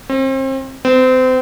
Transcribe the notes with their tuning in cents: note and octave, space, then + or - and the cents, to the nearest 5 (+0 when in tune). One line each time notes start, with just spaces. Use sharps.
C4 +35
C4 -30